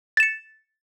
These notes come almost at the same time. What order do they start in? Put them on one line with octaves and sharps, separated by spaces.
A6 E7 C#7